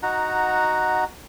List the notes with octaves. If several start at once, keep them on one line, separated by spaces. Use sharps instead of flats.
D#4 F#4 F#5 A#5